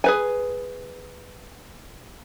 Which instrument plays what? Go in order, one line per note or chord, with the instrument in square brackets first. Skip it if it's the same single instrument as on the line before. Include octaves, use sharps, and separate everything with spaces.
[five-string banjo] G#4 B4 G#5